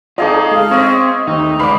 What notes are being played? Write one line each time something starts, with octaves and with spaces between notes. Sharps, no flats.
D#4 F4 G#4 A4 D5 D#5 F5 D6
G#3 F5
C4 C#5 D#5 E5
D#2 A3 D#4
C#2 B4 D5 F5 B5 D6